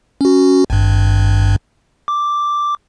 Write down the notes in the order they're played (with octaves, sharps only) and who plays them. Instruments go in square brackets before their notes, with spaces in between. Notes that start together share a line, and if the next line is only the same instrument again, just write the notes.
[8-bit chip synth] C#4 F#4
G#1 G2
D6